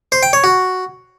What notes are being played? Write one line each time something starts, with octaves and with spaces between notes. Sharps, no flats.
C5
G5
C#5
F#4